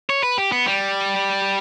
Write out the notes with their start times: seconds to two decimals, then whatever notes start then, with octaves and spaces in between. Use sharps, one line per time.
0.10 C#5
0.23 B4
0.38 G4
0.52 B3
0.66 G3